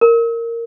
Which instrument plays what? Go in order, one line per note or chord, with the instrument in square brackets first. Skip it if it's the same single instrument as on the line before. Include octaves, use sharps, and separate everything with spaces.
[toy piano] A#4